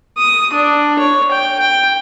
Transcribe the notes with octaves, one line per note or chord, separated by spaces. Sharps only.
D#6
D4
C#5
G5
G5